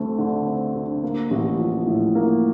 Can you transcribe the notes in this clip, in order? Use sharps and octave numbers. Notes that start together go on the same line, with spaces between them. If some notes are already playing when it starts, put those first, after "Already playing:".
Already playing: D2 A3 C4
D3
C4
D2
A#3
A1
F3
A2
A#3